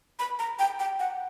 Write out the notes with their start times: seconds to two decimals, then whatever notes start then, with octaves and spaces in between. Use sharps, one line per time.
0.19 B5
0.39 A#5
0.59 G5
0.79 G5
0.99 F#5